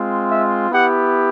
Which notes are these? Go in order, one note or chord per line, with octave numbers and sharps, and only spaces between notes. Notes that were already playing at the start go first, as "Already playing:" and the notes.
Already playing: G#3 C4 F4
E5
B3 E4 G4 F#5